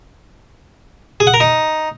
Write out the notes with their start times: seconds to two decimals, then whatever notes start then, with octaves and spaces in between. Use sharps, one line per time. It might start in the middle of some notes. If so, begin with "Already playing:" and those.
1.20 G#4
1.27 F#5
1.34 A#4
1.40 D#4